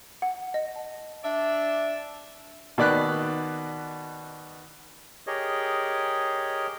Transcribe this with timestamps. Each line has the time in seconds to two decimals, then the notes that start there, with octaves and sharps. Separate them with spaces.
0.22 F#5
0.54 D#5
0.76 A5
1.24 D4 D5 E5
2.78 B2 D#3 D5 B5 F#6
5.27 G4 G#4 A#4 C#5 D#5